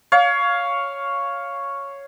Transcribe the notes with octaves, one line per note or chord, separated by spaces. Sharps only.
C#5 F5